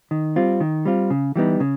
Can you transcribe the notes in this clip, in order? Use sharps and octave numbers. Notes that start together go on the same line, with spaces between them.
D#3
G3 C4 F4
D#3
G3 C4 F4
C#3
E3 G3 B3 D#4
C#3